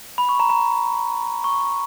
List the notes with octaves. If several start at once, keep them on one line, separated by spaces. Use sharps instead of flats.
B5
C#6
A#5
A#5
C#6